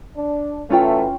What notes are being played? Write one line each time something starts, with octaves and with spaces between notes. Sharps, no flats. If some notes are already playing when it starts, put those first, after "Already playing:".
D4
E3 F#3 A3 C#4 F4 G5